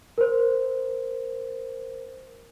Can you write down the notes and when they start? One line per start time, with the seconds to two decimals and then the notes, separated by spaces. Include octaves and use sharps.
0.18 A#4 C5